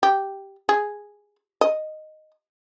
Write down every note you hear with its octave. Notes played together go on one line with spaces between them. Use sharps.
G4
G#4
D#5